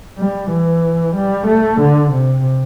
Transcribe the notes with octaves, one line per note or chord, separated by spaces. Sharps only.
G3
E3
G3
A3
D3
C3